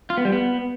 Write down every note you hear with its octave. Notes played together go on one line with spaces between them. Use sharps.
F4
B3
G3
B3